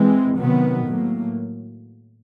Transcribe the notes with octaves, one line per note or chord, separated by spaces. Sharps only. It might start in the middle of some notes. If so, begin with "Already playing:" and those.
Already playing: E3 G#3 C4
C3 D#3 F#3 B3
A2 F#3 A#3